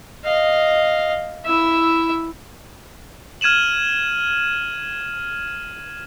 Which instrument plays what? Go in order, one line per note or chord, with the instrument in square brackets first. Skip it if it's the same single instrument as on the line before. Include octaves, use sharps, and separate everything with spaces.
[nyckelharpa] D#5 F5
E4 E5
[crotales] F6 G#6 D#7 E7 F#7